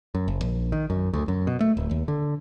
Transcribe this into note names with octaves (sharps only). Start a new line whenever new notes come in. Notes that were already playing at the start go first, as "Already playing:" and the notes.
F#2
F#1
A#1
D#3
F#2
D2
F#2
B2
A3
D1
D#2
D3